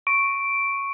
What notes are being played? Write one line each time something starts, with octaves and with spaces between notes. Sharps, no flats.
C#6 D7